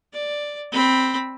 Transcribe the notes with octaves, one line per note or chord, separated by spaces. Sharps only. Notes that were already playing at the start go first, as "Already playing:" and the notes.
D5
C4 B5